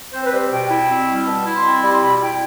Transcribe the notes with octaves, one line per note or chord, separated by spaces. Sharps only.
C4 C5
B4
G3 C5
B2 G5
E4
C4
G3
B2 A5
E4
C6
C4
G3 B5
C6
B2 B5
E4 G5